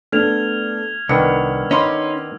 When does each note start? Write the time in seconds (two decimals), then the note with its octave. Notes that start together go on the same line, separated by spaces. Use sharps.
0.12 A3 B3 D4 F6 G#6 F7
1.09 C2 D#3 B3 D4 E6 C#7
1.71 C#4 D#4 B5 C6 D6